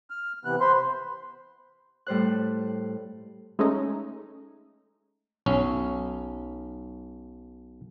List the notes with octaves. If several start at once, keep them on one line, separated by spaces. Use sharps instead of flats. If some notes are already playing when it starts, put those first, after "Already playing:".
F6
C3 E3 B3 F#6
C5 B5 C6
A2 G3 C5 F#6
G#3 A3 C#4 D#4
B1 C#4